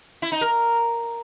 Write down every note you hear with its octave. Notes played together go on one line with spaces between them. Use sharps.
E4
D#4
A#4